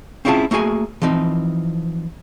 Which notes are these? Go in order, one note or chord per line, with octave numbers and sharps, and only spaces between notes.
C4 C#4 E4 F4 G#4 A5
A3 A#3 F#4 G#4 G#5
E3 F3 C4 D#4